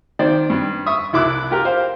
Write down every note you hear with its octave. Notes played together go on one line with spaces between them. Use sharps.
D#3 C5 D5
G2
E5 C#6 D#6
C2 E4 D6 E6 F#6
F4 G4 A#4
C5 F5